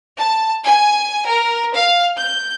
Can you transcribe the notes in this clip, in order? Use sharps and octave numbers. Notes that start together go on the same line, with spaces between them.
A5
G#5
A#4
F5
G6